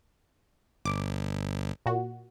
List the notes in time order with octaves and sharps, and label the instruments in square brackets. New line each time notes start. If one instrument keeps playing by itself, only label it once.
[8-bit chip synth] G1 [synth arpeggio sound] D6
[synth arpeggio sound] A#2 F#4